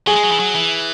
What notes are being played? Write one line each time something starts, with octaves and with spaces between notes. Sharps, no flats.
F#3 G#4
G#3
F#3
E3
F#3
E3